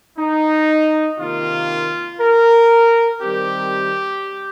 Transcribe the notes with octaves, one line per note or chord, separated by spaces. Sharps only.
D#4
C3 D#3 A#3 F4
A#4
D#3 G3 C4 G4